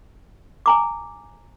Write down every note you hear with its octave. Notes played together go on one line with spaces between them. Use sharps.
G#5 A#5 D6